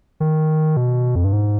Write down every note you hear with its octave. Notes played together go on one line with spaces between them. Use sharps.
D#3
B2
F2
G2
G#2